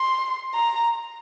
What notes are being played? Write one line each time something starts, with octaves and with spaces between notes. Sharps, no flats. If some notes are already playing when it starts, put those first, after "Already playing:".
Already playing: C6
A#5